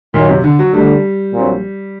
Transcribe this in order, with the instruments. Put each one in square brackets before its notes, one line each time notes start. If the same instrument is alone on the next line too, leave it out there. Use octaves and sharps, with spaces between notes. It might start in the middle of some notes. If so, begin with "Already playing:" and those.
[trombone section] F#2 D#3 F#3 [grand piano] A#2
[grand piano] C3
D3
F#3
[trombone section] D3 A3 D4 [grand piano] G3
[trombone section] A#1 A#2 F#3 C4